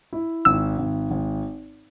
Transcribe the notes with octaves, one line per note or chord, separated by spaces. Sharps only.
E4
G#1 E6
G#1
G#1